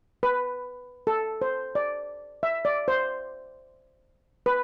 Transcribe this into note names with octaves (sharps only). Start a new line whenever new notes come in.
B4
A4
C5
D5
E5
D5
C5
B4